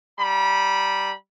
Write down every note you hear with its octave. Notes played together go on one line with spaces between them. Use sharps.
G3 A#5 B5